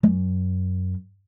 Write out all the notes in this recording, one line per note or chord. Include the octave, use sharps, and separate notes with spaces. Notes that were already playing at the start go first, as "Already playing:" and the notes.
F#2